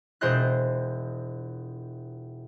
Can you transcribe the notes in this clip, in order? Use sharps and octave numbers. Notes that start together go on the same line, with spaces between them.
E1 F4 C5 D#5 D#6 F#6